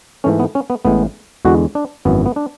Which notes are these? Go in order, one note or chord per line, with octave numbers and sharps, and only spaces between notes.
G#2 E3 A3 C#4
B3
C#4
B3
A1 A2 G#3 B3
E2 D3 G#3 F#4
D4
G#1 F#2 E3 B3
B3
D4